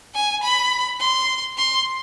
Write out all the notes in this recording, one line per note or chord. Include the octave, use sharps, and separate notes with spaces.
G#5
B5
C6
C6